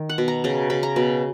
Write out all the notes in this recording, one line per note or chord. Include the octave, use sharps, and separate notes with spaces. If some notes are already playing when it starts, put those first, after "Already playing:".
Already playing: D#3
F#5
B2
A#5
C#3 A#5
C#3 B5
A#5
B2